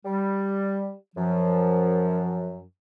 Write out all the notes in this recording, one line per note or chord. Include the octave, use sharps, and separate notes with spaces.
G3
F#2 F3